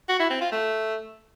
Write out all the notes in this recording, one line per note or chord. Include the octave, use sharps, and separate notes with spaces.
F#4
E4
C4
F4
A3